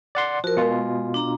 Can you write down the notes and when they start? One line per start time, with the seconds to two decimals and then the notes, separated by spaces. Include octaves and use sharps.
0.15 D5 F#5 C6
0.44 F3 F#4 A#4
0.57 B2 G#3 F4
1.14 D4 A#5